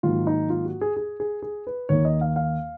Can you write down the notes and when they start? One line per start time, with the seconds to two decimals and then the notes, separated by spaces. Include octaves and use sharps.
0.03 G#2 D#3 F#3 A#3 F4
0.27 D#4
0.50 F4
0.65 F#4
0.81 G#4
0.96 G#4
1.20 G#4
1.42 G#4
1.67 B4
1.89 D#2 D#3 A#3 C#5
2.05 D#5
2.21 F5
2.36 F5